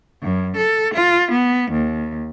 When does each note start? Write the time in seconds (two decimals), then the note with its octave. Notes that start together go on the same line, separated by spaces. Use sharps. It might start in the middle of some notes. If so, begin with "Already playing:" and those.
0.22 F#2
0.56 A4
0.94 F4
1.31 B3
1.71 D#2